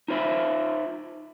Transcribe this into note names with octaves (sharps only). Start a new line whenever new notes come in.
D#4 F4 C5 E5 B5